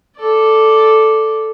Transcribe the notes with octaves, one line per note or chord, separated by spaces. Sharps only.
A4 D5